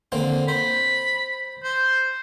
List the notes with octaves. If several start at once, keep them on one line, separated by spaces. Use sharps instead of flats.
D3 A#3 C4
C5 B5
C5